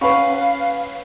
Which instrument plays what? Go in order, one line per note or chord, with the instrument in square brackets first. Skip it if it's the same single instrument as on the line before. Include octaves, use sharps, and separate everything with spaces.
[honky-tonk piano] C#4 B4 [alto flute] F5 [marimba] F#5 B5 C#6